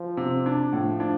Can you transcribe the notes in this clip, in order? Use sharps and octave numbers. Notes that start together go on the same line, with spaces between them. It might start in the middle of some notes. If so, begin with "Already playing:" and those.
Already playing: F3
C3
D4
A2 F3
D4